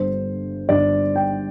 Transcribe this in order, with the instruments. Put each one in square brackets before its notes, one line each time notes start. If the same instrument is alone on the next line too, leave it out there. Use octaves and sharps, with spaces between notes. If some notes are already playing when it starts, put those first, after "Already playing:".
Already playing: [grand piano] G1 G2 D3 C5
G1 G2 D3 D5
G5